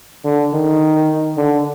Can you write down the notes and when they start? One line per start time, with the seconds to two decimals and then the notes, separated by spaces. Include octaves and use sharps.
0.24 D3
0.52 D#3
1.37 D3